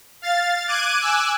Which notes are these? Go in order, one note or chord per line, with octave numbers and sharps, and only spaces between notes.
F5 A6
D6 F#6 G#6 D#7
G#5 D6 E6 F#6